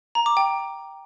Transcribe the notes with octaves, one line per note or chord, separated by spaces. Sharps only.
A#5
D6
G5